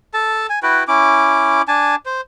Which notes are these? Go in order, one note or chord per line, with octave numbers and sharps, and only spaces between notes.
A4 A5
G#5
E4 F#4 B4 G5
C#4 E4 D6
D4 G#5 A5
C5